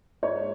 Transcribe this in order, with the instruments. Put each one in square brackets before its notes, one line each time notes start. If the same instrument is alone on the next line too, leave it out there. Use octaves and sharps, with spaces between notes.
[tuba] G#2 [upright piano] C#5